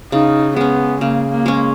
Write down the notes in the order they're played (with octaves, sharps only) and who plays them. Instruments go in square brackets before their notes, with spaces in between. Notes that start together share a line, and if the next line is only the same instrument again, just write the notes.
[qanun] C#3 [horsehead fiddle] D#4
[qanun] G#3 C#4 [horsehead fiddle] B3
[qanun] C#3 [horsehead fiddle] A#3
[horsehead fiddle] A#3
[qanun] G#3 C#4